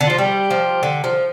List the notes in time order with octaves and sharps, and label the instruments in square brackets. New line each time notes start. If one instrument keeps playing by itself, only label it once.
[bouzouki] D3
[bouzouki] F3 [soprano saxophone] F4
[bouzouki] G3 [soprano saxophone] G4
[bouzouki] F3
D3
F3